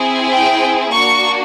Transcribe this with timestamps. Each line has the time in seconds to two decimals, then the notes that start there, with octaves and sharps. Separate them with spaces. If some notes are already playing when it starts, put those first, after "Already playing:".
Already playing: C4 E4 G#4
0.31 G5
0.92 A#3 D4 F#4 C#6